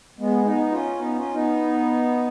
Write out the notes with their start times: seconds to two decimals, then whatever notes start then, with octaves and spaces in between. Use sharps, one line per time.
0.19 G#3 B3
0.45 B3 D#4
0.71 C#4 F4
0.98 B3 D#4
1.16 C#4 F4
1.33 B3 D#4